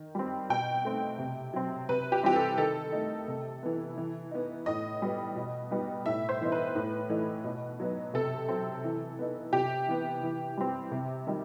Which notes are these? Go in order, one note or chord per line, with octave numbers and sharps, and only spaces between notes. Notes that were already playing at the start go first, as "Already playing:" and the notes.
Already playing: D#3
G3 C4
B2 G5
A3 C4 D#4
C3
F#3 C4
C3 B4
G4
E3 G3 C4 G4
A4
D#3 A4
A3 D#4
C3
E3 B3
E3
B3 D#4
A2 D#5
G3 B3
B2
G3 B3 D#4
A2 E5
C5
E3 B3 D#4
B4
A2
E3 A3 D#4
B2
F#3 B3 D#4
C3 A4
F#3 C4
E3
B3 D#4
C3 G4
E3 B3
E3
G3 C4
C3
D#3 G3